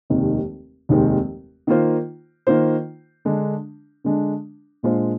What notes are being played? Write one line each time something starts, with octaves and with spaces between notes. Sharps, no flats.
F1 D#2 D#3 G#3 C4
F1 D#2 D#3 G#3 C4
D#3 A#3 F4 C5
D#3 A#3 F4 C5
D3 G#3 D4
D3 G#3 D4
A#2 G#3 D4 F4 C5